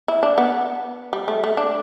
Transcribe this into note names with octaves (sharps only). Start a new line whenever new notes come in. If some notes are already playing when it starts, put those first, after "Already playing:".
E4
D4
B3
G3
A3
A3
D4